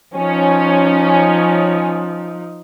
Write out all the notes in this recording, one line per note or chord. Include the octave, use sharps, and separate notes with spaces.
F3 C#4 D#4